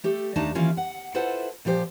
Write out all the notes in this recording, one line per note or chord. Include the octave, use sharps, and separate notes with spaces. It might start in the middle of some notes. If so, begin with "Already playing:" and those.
A3 G4 A4
D#2 A3 D4 D#4 A5 A#5
D#3 E3 A#3 C#4 E4 F4
F#5
E4 F4 A4 B4 C5 F#5
A#2 F3 G4 C5